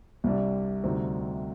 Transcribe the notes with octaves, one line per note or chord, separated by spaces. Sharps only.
C2 C3 G3 D4
D2 C3 G3 C4 D#4